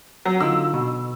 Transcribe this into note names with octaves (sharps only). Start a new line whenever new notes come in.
F#3
D3 D#4 F4 E6
B2